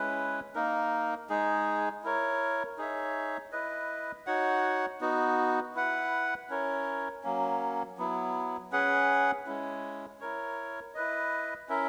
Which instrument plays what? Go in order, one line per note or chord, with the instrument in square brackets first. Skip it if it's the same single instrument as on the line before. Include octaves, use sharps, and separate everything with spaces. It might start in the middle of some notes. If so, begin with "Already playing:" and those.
Already playing: [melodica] G#3 C#4 E4 B4
A#3 D#4 A#4
G#3 D#4 G#4
E4 A#4 C#5
D#4 G#4 C#5 E5
E4 B4 D#5
D#4 F#4 C#5 F#5
B3 D#4 F#4
E4 B4 F#5
C#4 E4 A#4 C#5
F#3 A#3 C#4
F#3 B3 E4
C#4 G#4 B4 F#5
G#3 C#4 E4
E4 A#4 C#5
E4 B4 D#5
C#4 E4 A#4 E5